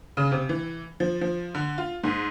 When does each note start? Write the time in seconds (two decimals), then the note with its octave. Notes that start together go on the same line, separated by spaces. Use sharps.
0.17 C#3
0.32 C3
0.49 E3
1.00 F3
1.21 F3
1.55 D3
1.78 F4
2.04 G#2